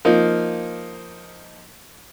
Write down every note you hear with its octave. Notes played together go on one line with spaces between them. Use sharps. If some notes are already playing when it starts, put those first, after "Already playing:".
F3 A#3 D#4